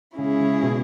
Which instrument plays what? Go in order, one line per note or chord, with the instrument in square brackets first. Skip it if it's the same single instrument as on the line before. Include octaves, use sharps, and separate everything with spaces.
[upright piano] C#3 [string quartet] G#3 C#4 E4 G#4
[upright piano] C#3
B2